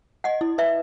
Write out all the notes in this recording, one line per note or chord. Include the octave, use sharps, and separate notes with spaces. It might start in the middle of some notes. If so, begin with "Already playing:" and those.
D#5 F#5
E4
B4 E5